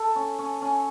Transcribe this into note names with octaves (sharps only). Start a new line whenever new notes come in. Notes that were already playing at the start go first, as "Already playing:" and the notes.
Already playing: A4
C#4
C#4
C#4